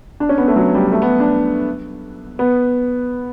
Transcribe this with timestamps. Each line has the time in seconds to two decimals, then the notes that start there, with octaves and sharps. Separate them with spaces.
0.20 D4
0.29 C#4
0.38 B3
0.48 A3
0.56 F#3
0.75 G3
0.92 A3
1.02 B3
1.20 D4
2.39 B3